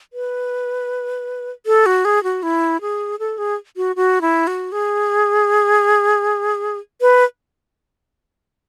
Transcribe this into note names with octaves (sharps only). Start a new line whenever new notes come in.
B4
A4
F#4
G#4
F#4
E4
G#4
A4
G#4
F#4
F#4
E4
F#4
G#4
B4